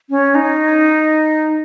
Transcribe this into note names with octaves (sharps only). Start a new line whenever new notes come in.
C#4
D#4